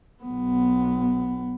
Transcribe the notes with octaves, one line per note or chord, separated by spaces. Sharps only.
B1 B3